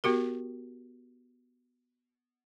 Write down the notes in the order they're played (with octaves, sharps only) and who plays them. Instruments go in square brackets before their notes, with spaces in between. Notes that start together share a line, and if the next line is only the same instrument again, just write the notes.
[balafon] B3 F#4 G4 A#4